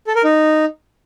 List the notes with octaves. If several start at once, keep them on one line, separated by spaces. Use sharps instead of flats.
A4
A#4
D#4